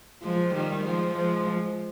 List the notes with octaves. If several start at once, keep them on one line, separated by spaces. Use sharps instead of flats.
F3 G#3
D#3 G3
F3 G#3
F3 G#3